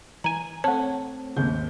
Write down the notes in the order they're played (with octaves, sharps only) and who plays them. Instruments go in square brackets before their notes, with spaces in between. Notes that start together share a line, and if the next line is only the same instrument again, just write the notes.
[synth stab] E3 G#5 [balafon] A#5
[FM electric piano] A3 C4 [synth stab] C#5 F#5 [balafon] A5
[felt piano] G#1 D#2 G6 [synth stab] C#3